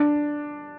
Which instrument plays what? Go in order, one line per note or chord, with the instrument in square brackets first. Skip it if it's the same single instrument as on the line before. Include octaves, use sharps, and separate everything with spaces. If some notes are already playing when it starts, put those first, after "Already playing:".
Already playing: [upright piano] D4